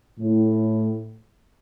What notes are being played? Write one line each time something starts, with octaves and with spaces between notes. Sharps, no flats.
A2